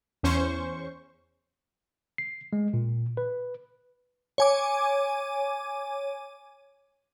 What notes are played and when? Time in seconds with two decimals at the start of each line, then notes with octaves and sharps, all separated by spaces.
0.23 E2 C#4 C5 C#6
2.18 C7
2.53 G#3
2.74 A#2
3.17 B4
4.38 C#5 G#5 D6